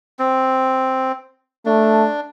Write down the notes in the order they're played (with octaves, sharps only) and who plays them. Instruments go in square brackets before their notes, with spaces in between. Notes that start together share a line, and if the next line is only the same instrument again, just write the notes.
[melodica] C4
[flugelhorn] A3 [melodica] D4